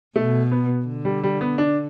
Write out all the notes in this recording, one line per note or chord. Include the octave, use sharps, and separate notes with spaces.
B2 A3
B3
D3
G3
G3
B3
D4